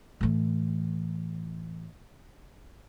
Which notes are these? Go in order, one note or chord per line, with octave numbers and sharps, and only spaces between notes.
A2 E3